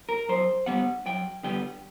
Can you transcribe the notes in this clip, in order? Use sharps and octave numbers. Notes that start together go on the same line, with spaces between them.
A#4
F#2 C5
D3 G3 B3 F#5
F#2 G5
D3 G3 B3 G5